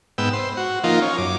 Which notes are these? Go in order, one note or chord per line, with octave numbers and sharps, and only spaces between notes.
G#2 B3 G5 E6
C5
F#4
F3 A#3 D#4 F4
C#4
F#2 D6